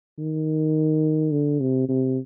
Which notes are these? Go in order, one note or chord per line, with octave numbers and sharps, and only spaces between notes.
D#3
D3
C3
C3